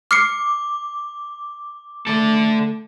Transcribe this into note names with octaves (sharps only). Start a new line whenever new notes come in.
D6 F6 C7 C#7
A3 A4 D5